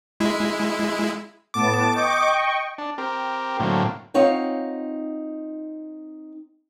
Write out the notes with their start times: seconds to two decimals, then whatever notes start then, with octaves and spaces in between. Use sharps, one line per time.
0.20 G#3 E4
1.54 A2 B3 A5 D6
1.94 D#5 G5 C#6
2.78 D4
2.98 C4 G4 A#4
3.60 A2 D3 F#3 A#3 C4
4.14 C4 D#4 F4 C#5 F#5 G5